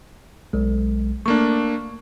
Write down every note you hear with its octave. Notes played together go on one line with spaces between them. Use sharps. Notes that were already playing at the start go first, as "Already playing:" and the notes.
B1 G#3
A3 A#3 D4 C#6